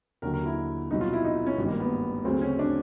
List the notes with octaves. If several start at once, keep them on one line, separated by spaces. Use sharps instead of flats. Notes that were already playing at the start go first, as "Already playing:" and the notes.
D#2 D3 F#3 A#4
A#4
E4
C2 B2 F#3 D#4
F4
E4
D#4
C#4
G#1 G2 D#3
A#3
B3
D2 C#3 F#3 C4
C#4
D4